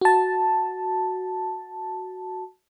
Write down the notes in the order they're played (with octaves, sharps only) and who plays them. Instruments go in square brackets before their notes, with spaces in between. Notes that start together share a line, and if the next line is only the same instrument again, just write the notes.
[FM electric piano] F#4 A5